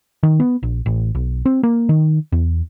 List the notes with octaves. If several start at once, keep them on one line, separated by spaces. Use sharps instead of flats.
D#3
B3
A#1
A1
B1
C4
A#3
D#3
E2